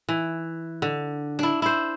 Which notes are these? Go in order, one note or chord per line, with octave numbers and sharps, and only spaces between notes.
E3
D3
D4 E4
E4 C5